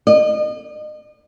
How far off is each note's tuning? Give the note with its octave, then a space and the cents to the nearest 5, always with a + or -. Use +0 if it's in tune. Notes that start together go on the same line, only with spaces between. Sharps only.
D#5 -35